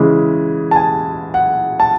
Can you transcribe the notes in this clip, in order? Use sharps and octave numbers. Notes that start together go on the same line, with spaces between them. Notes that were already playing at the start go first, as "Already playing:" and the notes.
Already playing: C#3 E3 G#3
A5
G#5
F#5
A5